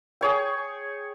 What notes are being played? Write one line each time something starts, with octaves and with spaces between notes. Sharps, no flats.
G#4 C#5 G5